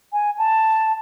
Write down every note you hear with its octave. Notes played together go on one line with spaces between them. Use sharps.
G#5
A5